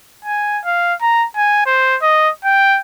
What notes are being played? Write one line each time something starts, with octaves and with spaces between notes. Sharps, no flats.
G#5
F5
A#5
G#5
C5
D#5
G5